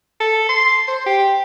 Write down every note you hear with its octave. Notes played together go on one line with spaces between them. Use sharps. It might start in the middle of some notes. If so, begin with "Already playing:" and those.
A4
C6
C5
G4